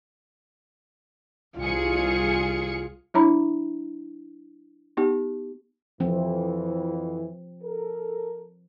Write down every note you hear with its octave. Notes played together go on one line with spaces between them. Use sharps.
C2 F4 G#4 C#7
F#3 D4 E4 C#5 A#5 B5
B3 D#4 G4
F2 E3 F3 C4
A4 A#4